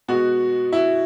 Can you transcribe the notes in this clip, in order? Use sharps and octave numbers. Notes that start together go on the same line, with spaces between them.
B2 G#3 B3 F#4
E4